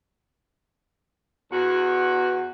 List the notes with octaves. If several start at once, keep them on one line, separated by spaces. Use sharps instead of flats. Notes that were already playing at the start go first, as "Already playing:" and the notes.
E2 F#4